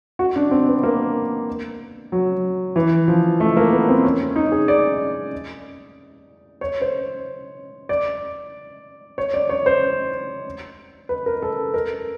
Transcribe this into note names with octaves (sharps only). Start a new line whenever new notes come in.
F#4
D4
C4
B3
A#3
F#3
E3
F3
A3
A#3
B3
C4
C#4
C#4
D#4
G#4
D5
C#5
C5
D5
C#5
D5
C#5
C5
B4
A#4
A4
A#4